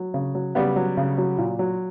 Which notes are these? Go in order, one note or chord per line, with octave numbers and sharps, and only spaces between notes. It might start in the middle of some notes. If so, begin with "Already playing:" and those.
Already playing: F#3
C#3
F#3
C#3 G3 B3
F#3
C#3
F#3
A#2
F#3